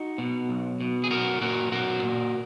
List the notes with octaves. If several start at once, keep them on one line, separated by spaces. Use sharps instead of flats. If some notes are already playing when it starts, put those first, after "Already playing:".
Already playing: D#4 F#4
B2
B1
B2
G#4
B1 F#4 A#4
A#2 F#4 A#4
B1 F#4 A#4
A#2